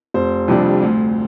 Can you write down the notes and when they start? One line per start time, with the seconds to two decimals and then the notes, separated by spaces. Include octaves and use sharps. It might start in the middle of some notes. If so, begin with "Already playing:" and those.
0.14 F1 C5
0.48 F2 C3 G3 D4
0.82 D2